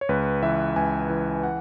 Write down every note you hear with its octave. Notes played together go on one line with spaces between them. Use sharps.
C#5
C#2 B4
E3 E5
C#2 G#5
E3
F#5